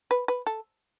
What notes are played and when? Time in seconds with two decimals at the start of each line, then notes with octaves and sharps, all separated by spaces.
0.11 B4
0.28 B4
0.47 A4